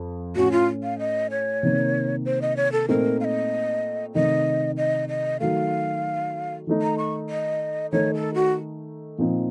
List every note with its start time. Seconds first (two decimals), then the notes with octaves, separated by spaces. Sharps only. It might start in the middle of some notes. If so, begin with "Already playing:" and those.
Already playing: F2
0.36 A2 A3 C#4 F#4
0.52 F4
0.83 F5
0.99 D#5
1.31 C#5
1.63 C3 D#3 A#3
2.25 C5
2.42 D#5
2.57 C#5
2.72 A4
2.89 A#2 A3 C4 D#4 A#4
3.20 F5
3.24 D#5
4.14 C3 D#3 A3 D#5
4.77 D#5
5.09 D#5
5.40 D#3 F#3 A3 F5
6.67 D#3 A3 D#4
6.82 A#5
6.98 C#6
7.30 D#5
7.92 D#3 A3 D#4 C#5
8.14 A4
8.34 F#4
9.18 A#2 F3 C4 D#4